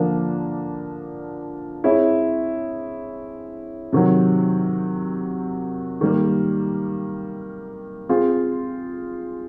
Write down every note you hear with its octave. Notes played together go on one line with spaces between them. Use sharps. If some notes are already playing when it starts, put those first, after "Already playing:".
Already playing: D3 F3 A#3 D4
C4 E4 G#4 C#5
C3 D#3 F#3
D#3 G3 A#3
C4 F4 G#4